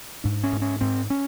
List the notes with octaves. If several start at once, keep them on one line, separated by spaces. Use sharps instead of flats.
G#2 D4
C#4
G#2
C#4
G#2 C4
C#4